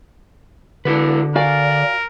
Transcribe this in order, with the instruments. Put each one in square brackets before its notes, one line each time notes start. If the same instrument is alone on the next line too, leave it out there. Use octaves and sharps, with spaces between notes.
[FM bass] D3 [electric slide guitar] E4 F#4 B4
[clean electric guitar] F#4 F5 G#5 [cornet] A#4 [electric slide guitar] D5